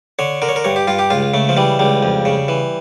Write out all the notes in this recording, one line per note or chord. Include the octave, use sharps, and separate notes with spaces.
D3 C#5
D3 A#4
C#5
A#4
G2 C#5
G4
G2 F4
G4
C#2 F4
C#3 A3
F3
E3 G3
C#2 G3
F2
C#3
E3